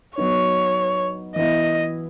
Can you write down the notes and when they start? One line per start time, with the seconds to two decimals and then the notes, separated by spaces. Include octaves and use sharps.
0.17 F#3 B3 D#4 C#5
1.36 E3 B3 E4 D#5